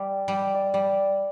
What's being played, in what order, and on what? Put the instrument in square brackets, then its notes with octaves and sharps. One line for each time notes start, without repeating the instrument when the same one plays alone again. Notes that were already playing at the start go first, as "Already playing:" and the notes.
Already playing: [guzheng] G3 [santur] D5
[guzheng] G3 [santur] D5
[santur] D#5
D5
[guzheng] G3 [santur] D5